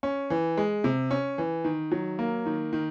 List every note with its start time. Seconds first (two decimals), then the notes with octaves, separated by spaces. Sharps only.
0.03 C#4
0.30 E3
0.57 G#3
0.84 C3
1.11 C#4
1.38 E3
1.64 D#3
1.92 F#3
2.19 A#3
2.46 D#3
2.73 D#3